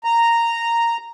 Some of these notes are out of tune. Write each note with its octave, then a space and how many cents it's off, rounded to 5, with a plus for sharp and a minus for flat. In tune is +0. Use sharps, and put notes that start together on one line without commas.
A#5 -5